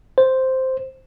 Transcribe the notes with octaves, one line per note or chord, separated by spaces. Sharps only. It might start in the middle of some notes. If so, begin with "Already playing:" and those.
C5